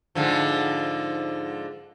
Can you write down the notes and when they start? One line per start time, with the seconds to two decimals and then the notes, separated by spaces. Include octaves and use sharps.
0.15 G#2 D3 F3